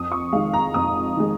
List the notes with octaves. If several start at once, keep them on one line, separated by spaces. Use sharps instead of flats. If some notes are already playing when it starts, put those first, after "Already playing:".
Already playing: F2 D#6
C#6
D#3 G#3 F5
A#5
F2 D#6
D#3 G#3